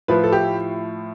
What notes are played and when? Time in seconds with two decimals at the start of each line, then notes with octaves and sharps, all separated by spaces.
0.08 A2 F3 B4
0.24 A4
0.32 G4